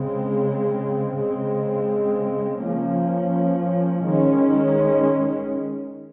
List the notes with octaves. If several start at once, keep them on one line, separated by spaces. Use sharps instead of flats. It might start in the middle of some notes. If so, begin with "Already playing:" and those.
Already playing: C#3 G#3 C4
C#3 G#3 C4
F3 A#3 C#4
D#3 G#3 C#4